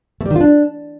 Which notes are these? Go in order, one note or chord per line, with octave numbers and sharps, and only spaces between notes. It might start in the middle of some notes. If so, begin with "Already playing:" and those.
A3
G3
D#3
F4
D4